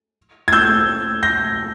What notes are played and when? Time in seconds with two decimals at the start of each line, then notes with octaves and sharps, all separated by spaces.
0.48 G#6
0.52 E6 G6
1.23 G6 A#6